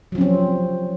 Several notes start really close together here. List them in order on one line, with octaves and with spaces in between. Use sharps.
F#3 F3 C#4 C4